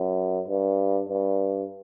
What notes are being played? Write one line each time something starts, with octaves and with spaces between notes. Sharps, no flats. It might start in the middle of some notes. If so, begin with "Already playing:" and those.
Already playing: F#2
G2
G2